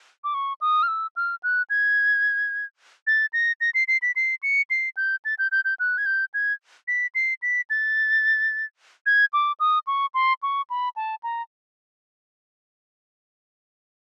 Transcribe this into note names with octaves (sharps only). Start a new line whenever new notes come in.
D6
C#6
D#6
F6
E6
F6
F#6
G#6
A6
A#6
A#6
C7
C7
B6
C7
C#7
C7
G6
A6
G6
G6
G6
F#6
G#6
G6
G#6
B6
C7
B6
A6
G#6
D6
D#6
C#6
C6
C#6
B5
A5
A#5